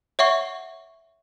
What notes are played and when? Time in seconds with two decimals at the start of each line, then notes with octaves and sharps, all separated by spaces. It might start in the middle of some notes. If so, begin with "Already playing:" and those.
0.19 C#5 E5 F#5 C#6